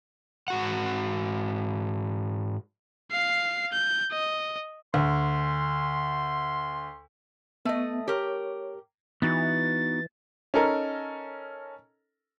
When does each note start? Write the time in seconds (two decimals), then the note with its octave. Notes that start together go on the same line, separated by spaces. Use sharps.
0.48 G#2 F#4 F#5
3.11 F5 C7
3.72 G6
4.11 D#5
4.94 D2 C6
7.65 A3 B3 D#5
8.08 G4 A#4 C#5
9.22 E3 B3 D#4 F#4 A6
10.54 C#4 D#4 A4 A#4